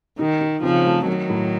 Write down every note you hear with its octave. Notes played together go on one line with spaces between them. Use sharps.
D#3 D#4
D#4
C#3 F3 C4
A3
D#3 F#3 A3
A2